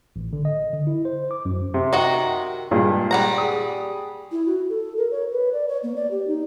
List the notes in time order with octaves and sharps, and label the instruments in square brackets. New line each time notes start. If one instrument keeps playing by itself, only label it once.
[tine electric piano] A1
D3
D#5
D3
E4
C5
D6
F#2
[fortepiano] C3
[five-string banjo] D#3 F#4 D#5
[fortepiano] G2 A#2 G#3
[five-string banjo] G3 F#5 A#5
[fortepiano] G#4 D#6
[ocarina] E4
F#4
A4
A#4
C#5
B4
D5
C#5
A#3
D5
G4
D#4